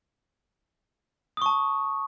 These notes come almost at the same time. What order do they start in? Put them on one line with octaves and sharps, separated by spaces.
D#6 C#6 A5